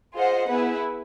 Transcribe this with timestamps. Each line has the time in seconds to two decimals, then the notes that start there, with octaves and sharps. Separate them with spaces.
0.14 F4 G#4 C5 D#5 F#5
0.48 B3 E4 G#4 B4